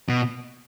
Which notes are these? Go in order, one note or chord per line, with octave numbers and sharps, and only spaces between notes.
B2